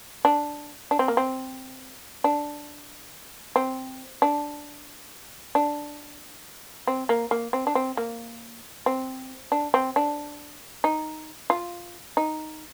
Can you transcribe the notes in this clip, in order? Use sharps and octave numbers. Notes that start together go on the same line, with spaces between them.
D4
D4
C4
A#3
C4
D4
C4
D4
D4
C4
A#3
A#3
C4
D4
C4
A#3
C4
D4
C4
D4
D#4
F4
D#4